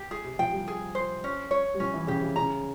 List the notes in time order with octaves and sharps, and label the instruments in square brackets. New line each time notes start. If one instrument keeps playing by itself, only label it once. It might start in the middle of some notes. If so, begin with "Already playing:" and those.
Already playing: [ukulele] G4
G#4
[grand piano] C3
[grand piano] F3 [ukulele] G5
[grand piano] G3
[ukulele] G#4
C5
C#4
C#5
[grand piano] G3
[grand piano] F3 [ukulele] C#4
[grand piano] E3
[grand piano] C#3 [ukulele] G4
[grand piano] C3
[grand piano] C#3 [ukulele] A#5